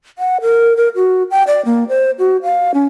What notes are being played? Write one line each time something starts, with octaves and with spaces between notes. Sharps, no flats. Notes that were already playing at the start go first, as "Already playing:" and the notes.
F#5
A#4
A#4
F#4
G5
D5
A#3
C5
F#4
F5
C#4